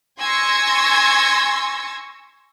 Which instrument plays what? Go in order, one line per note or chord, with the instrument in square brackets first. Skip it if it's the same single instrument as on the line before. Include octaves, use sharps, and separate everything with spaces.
[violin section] G#5 C6 C#6 E6 G#6 A#6